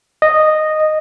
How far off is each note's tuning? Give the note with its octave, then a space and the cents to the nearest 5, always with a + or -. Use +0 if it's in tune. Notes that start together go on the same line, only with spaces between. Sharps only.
D#5 -10